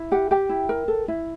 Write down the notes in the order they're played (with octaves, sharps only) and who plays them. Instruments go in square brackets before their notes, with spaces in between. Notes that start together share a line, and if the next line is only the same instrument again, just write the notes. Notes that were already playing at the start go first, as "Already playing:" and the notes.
Already playing: [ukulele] E4
G4 F#5
G4 G5
E4
A#4
A4
E4